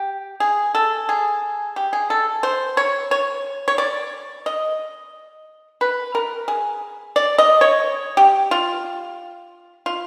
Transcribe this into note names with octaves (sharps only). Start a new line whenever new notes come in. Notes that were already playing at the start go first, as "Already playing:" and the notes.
Already playing: G4
G#4
A4
G#4
G4
G#4
A4
C5
C#5
C#5
C#5
D5
D#5
B4
A#4
G#4
D5
D#5
C#5
G4
F4
F4